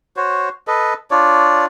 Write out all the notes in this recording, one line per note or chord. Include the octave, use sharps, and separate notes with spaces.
F#4 C5 C#5
A4 B4 D#5
D4 F4 C#5 D5